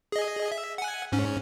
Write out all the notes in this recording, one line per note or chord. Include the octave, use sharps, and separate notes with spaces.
G#4 D#5
E5
F#5 G#5
G#2 C#4